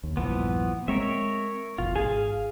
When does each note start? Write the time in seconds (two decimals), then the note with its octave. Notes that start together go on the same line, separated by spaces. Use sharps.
0.03 D#2
0.17 A#1 E2 G2 E3 F3 B3
0.88 G#3 C4 A#4 C#5 E5
1.78 F#1 B1 E2 F4
1.96 G#1 G#4 F5